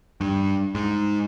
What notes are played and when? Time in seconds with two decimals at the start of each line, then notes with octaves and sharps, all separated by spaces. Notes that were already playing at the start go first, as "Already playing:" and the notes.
0.21 G2
0.75 G#2